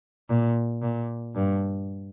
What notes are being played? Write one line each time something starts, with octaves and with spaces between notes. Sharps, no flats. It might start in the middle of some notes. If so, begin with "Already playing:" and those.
A#2
A#2
G2